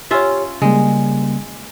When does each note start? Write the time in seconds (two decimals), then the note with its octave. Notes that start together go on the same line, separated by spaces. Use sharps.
0.11 C#4 F4 G4 C#5 E5
0.62 C#3 G3 G#3 A#3